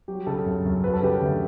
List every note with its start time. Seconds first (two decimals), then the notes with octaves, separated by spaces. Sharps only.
0.08 F#3 G4
0.26 C#3 A4
0.46 F#2
0.65 F#2
0.83 F#3 B4
0.93 A4
1.02 C#3 G4 B4
1.21 D2